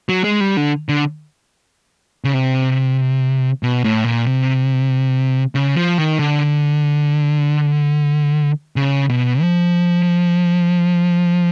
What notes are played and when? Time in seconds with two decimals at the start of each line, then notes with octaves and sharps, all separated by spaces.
0.09 F#3
0.24 G#3
0.41 G3
0.57 D3
0.89 D3
2.24 C#3
2.34 C3
3.63 B2
3.84 A2
4.05 A#2
4.26 C3
5.55 C#3
5.76 F3
5.98 D#3
6.19 D3
8.76 C#3
9.10 B2
9.41 F3